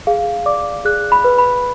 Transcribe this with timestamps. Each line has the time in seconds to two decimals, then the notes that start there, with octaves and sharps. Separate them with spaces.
0.07 G#4 F5
0.46 D5 D6
0.85 G#4 F#6
1.12 B5
1.24 B4
1.38 B5